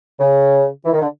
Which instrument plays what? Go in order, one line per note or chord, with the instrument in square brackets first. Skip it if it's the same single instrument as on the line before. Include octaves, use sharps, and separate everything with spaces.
[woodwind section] C#3
E3
D#3
D3